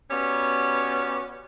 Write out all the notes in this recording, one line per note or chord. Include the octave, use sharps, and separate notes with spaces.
B3 C#4 F#4 G4 B4 D5